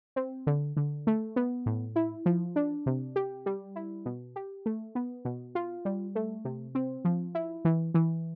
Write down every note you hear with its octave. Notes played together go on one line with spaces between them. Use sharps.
C4
D3
D3
A3
B3
A2
E4
F3
D4
C3
G4
G3
E4
B2
G4
A3
B3
B2
F4
G3
A3
C3
C4
F3
E4
E3
E3